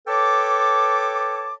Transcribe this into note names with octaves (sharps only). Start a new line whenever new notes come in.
A4 B4 C#5 G5 A5 D6